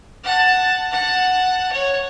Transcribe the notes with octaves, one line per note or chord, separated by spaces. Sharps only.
F#5 A5
F#5 A5
C#5